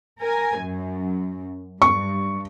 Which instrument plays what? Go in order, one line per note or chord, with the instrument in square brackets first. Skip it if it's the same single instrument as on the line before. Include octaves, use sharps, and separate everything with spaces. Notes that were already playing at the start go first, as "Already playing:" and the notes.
[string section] A#4 G#5
F#2
[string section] G2 [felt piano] C#6